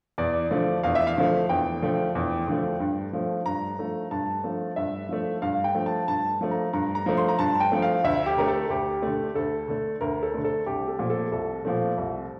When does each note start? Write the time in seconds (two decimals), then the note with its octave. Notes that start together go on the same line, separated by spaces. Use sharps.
0.18 E2 D5
0.51 D3 F3 A3
0.83 E2 F5
0.95 E5
1.07 F5
1.17 D3 F3 A3
1.49 E2 G5
1.82 D3 F3 A3
2.15 E2
2.48 D3 F3 A3
2.80 G2
3.13 F3 A3
3.46 G2 A#5
3.79 F3 A3
4.11 G2 A5
4.44 F3 A3
4.76 G2 E5
5.09 F3 A3
5.42 G2 F5
5.64 G5
5.75 F3 A3
5.86 A5
6.08 G2 A5
6.41 F3 A3
6.51 A#5
6.73 G2 A#5
6.95 A#5
7.06 F3 A3
7.17 C6
7.29 A#5
7.39 G2 A5
7.60 G5
7.72 F3 A3
7.82 F5
8.04 D2 E5
8.26 G4
8.37 D3 A3 A#4
8.48 A4
8.70 D2 G4
9.02 D3 A3
9.35 D2 A4
9.68 D3 A3
10.01 D2 A#4
10.23 A4
10.34 D3 A3
10.44 A4
10.66 C2 G4
10.88 A4
10.99 A#2 F3 A3
11.10 A4
11.32 C2 A4
11.65 A#2 F3 A3
11.97 C2